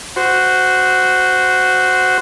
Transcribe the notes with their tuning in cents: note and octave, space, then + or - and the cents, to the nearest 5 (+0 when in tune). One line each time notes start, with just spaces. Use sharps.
F#4 +0 C5 -15